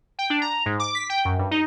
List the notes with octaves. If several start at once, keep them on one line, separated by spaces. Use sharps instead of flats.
G5
D4
A#5
G#2
D6
B6
G5
F#2
G2
D#4